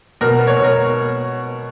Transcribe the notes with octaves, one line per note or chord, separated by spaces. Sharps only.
B2 A#4
B3
C#5
B2
A#4